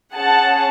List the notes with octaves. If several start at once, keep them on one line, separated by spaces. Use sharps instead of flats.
C#4 G#4 F#5 A5